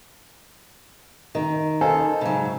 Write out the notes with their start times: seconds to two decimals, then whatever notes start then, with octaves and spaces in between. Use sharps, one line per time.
1.35 D#3 D#5
1.81 D#4 A4 C5 F5 G#5
2.21 G#2 C#3 F#3